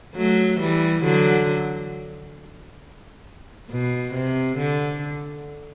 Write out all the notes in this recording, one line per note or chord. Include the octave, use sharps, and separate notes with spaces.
F#3 A3
E3 G3
D3 F#3
B2
C3
D3